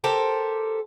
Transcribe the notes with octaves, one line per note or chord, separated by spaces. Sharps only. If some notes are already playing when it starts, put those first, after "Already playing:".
G4 A4 A#4 C5